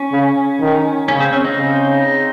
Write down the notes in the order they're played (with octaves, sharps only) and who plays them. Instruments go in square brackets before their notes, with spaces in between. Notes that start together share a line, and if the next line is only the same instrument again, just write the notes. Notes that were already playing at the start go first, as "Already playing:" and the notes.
Already playing: [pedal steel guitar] C#4
[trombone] C#3
D#3
[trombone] C#3 [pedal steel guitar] C#4
[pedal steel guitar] C4
C#4
C4 D#4
[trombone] C#3